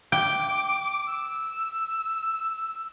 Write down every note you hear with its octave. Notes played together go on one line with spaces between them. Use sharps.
G5 D6
E6